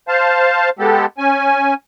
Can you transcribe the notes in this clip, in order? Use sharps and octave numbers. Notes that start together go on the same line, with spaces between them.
C5 F5 A5
G#3 B3 G4 A4
C#4 G#5